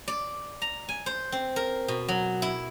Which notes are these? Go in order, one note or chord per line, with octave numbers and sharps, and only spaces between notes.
D5
A#5
G#5
C5
C4
A#4
B2
F#3
E4